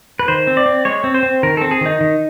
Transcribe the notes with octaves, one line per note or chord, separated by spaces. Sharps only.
B4
D#3 C5
C4
D5
C4
G#3 C#5
C4
C5
C4
D#3 A#4
C4 A4
G#4
D#3 D#4
D#3